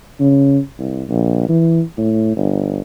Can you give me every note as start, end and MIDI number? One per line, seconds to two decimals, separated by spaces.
0.19 0.59 49
0.79 1.02 36
1.09 1.45 34
1.49 1.82 52
1.98 2.34 45
2.36 2.81 31